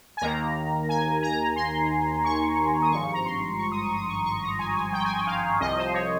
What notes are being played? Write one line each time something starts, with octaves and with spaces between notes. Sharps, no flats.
G#5
D#2 D#3 A#3 A#5
G#5
A#5
C6
C#6
D#6
G#1 G2 F3 C#6
A#5
C6
C#6
D#6
C#6
D#6
C#6
C#6
A#5
G#5
G#5
G5
G#5
G5
F5
C2 C3 F3 D#5
C5
C#5